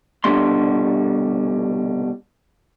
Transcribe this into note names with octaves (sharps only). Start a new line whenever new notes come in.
C2 B2 D3 G3 A3 C6